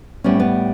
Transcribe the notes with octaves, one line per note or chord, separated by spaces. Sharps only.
A2 G3 B3 C#4
B3